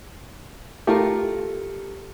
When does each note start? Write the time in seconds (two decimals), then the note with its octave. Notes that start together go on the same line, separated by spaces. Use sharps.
0.87 A3 F4 G4 A4 A#4